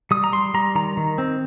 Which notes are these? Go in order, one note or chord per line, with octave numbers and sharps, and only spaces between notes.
G3 D#6
A#5
G3 C6
G3 A#5
D#3 A#5
D#3
C4